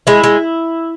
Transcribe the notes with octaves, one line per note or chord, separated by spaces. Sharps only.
G#3 E4
G#3